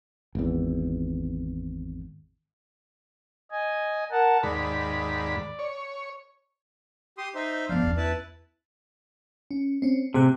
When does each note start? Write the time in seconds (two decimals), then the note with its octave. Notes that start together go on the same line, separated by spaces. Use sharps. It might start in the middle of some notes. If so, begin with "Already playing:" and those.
0.35 G#1 E2
3.51 D#5 G#5
4.11 A#4 F#5 A5
4.43 D#2 G#2 D5 B5
5.59 C#5
7.18 G4 C6 D#6
7.35 D#4 C5 E5
7.69 F3 B3 D4 F5
7.82 E2 C#4
7.97 E4 B4 A5
9.51 C#4
9.82 C4 C#4
10.14 A2 C3 G#4 F#6